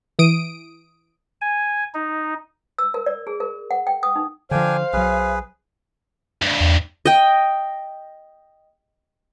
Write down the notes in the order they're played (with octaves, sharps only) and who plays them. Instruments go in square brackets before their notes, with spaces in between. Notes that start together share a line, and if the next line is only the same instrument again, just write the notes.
[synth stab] E3 D#6 D7
[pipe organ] G#5
D#4
[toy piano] E6
A#4
D5
G#4
A#4
F#5
G5
D#6
D#4
[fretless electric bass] D3 F3 [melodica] D4 G5 G#5 [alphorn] C5 [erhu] F5
[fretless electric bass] B1 F#3 [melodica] G#4 B4
[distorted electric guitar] D2 G2
[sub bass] E2
[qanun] D#5 G5